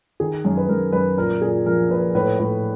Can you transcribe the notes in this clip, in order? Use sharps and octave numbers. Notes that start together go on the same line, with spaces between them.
D#3 G#4
F#2
B4
F#2 A#4
F#2 B4
A#2 A#4
A#2 G#4
F3 A#4
A#2 B4
A2 B4
A2